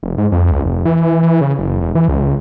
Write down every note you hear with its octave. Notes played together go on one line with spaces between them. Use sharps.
F1
G#2
F2
C#2
F1
E3
E3
C#3
F#1
E1
E3
C#2